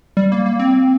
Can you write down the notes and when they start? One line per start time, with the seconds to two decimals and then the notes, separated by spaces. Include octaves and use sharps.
0.17 G3
0.32 A#3
0.46 A#3
0.59 C4